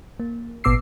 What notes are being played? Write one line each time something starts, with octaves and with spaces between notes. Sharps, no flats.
A#3
G#1 A#2 B3 D6 E6 C7